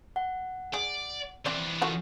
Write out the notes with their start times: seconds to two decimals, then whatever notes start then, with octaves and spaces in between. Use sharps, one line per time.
0.16 F#5
0.74 G#4 D5
1.46 E3 C4 D4 D5
1.82 F4 F#4 A4